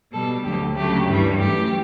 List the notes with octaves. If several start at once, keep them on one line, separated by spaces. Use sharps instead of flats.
B2 G3 A4
D2 D3 F#3 G4
D2 C#3 F#3 A3 G4
G2 E3 G3
F#2 E3 A3 G4